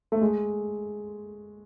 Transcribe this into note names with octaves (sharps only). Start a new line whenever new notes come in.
A3
G#3